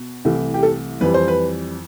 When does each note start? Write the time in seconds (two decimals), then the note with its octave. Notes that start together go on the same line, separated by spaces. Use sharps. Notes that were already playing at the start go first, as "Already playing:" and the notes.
Already playing: B2
0.25 C2 C3 E3 A3
0.54 G4
0.63 A4
1.00 F2 E3 G3 B4
1.14 C5
1.28 B4